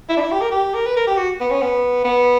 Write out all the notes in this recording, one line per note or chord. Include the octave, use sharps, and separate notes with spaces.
E4
D4
E4
G4
A#4
G4
A#4
B4
A#4
G4
F#4
B3
C#4
B3
B3